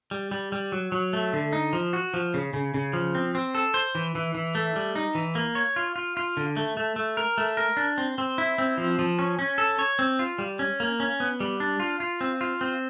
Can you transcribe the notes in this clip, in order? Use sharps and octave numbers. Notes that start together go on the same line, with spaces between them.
G3
G3
G3
F#3
F#3
A3
D3
D#4
F3
F#4
F3
C#3
C#3
C#3
F3
C4
C4
A4
C5
E3
E3
E3
A3
G3
D#4
E3
A#3
C#5
F4
F4
F4
D3
A3
A3
A3
A#4
A3
A#4
D4
C4
C4
E4
C4
F3
F3
C#4
C#4
A4
C#5
C4
F4
G3
C#4
A#3
C#4
B3
G3
D4
F4
F4
C4
F4
C4